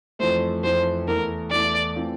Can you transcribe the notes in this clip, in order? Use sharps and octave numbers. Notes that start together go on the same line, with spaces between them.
F2 E3 A3 C5
F2 E3 A3 C5
E2 E3 A3 E4 A#4
E2 E3 A3 E4 D5
E3 A3 C4 F4